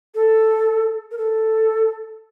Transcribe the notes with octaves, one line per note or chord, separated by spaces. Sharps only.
A4
A#4
A4